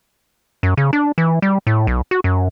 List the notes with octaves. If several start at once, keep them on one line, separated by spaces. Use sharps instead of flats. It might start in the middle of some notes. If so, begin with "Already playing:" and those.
F#2
C#3
D4
E3
G3
A2
B1
F#4
F#2